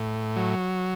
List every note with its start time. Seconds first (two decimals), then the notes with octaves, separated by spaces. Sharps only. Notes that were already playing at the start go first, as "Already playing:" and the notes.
Already playing: A2
0.36 F#3